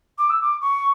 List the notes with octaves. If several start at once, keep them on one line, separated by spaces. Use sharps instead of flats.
D6
E6
D6
C#6